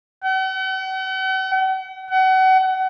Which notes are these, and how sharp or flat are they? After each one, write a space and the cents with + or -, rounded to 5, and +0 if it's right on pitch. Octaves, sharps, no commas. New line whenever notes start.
F#5 +45
F#5 +30